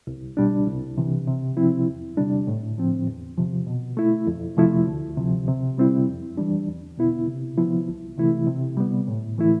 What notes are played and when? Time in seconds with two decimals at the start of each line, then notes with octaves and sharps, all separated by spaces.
0.07 C2
0.37 B2 G3 D4
0.67 C2
0.98 C3 E3
1.27 C3
1.57 F3 C4 E4
1.87 E2
2.17 C3 G3 D4
2.47 A2
2.78 F3 C4
3.07 E2
3.37 C3 F3
3.67 B2
3.97 A3 E4
4.27 F2
4.57 C3 F3 A3 E4
4.87 D2
5.17 C3 F3
5.48 C3
5.78 G3 C4 E4
6.08 F2
6.37 E3 G3 D4
6.68 E2
6.98 B2 B3 E4
7.27 C3
7.58 F3 B3 E4
7.88 C2
8.18 C3 E3 A3 E4
8.47 C3
8.77 G3 B3
9.08 A2
9.38 E3 A3 E4